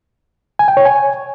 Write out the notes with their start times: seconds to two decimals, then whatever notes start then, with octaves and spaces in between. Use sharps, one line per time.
0.59 G#5
0.68 G5
0.77 C#5
0.86 G#5